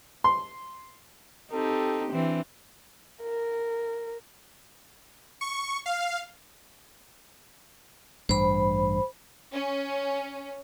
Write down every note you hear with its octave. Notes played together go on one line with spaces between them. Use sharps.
C6
C4 D#4 G4 A4
E3 C4 D4
A#4
C#6
F5
A1 G2 C5 B5
C#4